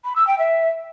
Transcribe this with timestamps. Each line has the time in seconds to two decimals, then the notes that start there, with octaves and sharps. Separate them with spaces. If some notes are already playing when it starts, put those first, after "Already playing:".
0.04 B5
0.15 E6
0.27 G5
0.38 E5